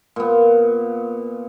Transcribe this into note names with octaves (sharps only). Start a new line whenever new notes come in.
A#2 B3